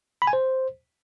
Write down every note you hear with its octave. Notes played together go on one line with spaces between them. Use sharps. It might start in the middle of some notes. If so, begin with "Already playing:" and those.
B5
G#5
C5